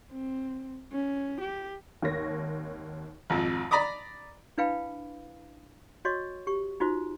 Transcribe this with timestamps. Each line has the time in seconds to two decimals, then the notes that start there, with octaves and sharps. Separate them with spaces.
0.11 C4
0.92 C#4
1.41 G4
2.02 G#1 D#2 C#5 A#6
3.30 G#1 F2
3.71 D5 A#5 B5 D6 D#6
4.58 D4 E4 B4 F5 G5 B5
6.05 F#4 C#5 D#5 C6 C#6
6.47 G4 C#6
6.80 D#4 F4 F#4 C5